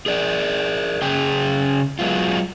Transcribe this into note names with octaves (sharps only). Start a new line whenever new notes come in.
G#4 A#4 D5
C#3 G#4 G5
F#3 G#3 B3 F4